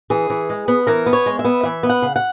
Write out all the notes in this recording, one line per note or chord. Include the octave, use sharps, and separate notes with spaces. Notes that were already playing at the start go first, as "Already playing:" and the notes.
E3 G#4
E3
G#3
B3
E3 A#4
B3
C#5
G#3
E5
B3
E3 E5
B3
F#5
C#3
F#5